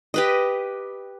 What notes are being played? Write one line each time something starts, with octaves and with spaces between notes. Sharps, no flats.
G4 B4 D#5